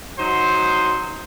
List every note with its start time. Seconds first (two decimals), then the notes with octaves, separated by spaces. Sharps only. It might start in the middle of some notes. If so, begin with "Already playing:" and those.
0.19 F#3 D#4 C5